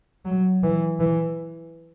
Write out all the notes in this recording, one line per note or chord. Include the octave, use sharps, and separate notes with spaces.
F#3
E3
E3